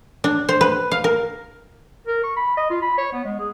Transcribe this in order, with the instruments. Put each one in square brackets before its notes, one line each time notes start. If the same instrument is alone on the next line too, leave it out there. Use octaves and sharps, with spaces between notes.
[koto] D4
C5
B4
F5
A#4
[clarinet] A#4
C#6
B5
D#5
F4
B5
C#5
B3
G#3
G#4